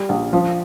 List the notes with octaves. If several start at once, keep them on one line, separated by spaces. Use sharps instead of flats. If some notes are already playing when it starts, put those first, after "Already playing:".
Already playing: G3
A#1
F3